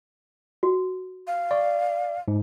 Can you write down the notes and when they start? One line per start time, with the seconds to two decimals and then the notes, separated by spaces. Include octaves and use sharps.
0.63 F#4
1.27 F5
1.51 D5 C#6
2.28 G#2